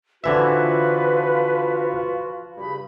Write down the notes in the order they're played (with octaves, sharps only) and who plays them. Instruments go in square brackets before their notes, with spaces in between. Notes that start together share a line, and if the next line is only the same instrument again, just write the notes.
[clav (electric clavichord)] D3 E3 E5 [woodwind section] F3 F4 F#4 [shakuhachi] B4
[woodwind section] G2 C#3 [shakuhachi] B5